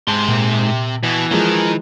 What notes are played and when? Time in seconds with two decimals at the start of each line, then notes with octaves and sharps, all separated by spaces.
0.08 G#2 C3 A5 C6
0.28 A#2
1.03 B2 E3
1.31 D#3 F3 G#3